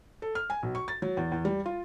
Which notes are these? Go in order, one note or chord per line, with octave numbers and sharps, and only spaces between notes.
A4
F6
G#5
B1
C#6
A6
F#3
E2
E2
G3
F4